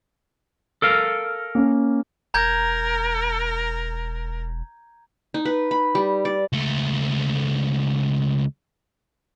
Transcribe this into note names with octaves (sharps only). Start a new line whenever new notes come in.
A4 A#4 F5
A#3 C#4
E1 A#4 A#5 G6 G#6
D#4
B4
B5
G3
D5
C#2 A3